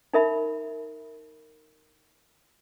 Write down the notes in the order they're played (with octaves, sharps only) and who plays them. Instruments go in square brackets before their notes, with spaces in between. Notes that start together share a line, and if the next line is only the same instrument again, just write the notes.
[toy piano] D#4 A#4 E5 B5